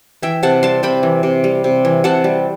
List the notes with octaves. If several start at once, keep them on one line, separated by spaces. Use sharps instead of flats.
E3 E5 G5
C3 F#5 A5
G3 A5 C6
C3 G5 B5
E3
C3
G3
C3
E3
C3 F#5 A5
G3